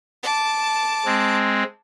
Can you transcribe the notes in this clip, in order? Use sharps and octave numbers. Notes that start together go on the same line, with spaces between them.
A5 D6
G#3 C4